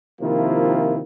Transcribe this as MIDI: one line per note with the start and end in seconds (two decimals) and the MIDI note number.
0.21 1.00 48
0.21 1.00 51
0.21 1.00 53
0.21 1.00 58
0.21 1.00 64
0.21 1.00 65